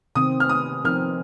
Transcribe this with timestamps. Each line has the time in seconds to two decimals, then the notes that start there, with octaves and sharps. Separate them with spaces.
0.15 C3 D#3 C4 D#6
0.40 F6
0.49 D#6
0.85 F3 C4 D#4 A#4 F6